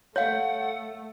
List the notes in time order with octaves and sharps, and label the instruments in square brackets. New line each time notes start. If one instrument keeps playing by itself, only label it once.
[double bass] A3 [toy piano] C#5 F5 [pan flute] F#5